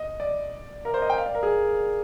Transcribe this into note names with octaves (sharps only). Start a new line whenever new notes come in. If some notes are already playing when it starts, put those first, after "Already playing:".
Already playing: D#5
D5
A#4
C5
D#5
G5
F5
D5
A#4
G#4